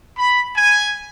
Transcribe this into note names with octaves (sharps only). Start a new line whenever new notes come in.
B5
G#5